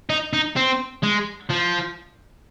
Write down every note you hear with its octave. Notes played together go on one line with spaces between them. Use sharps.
D#4
D#4
C4
G#3
F3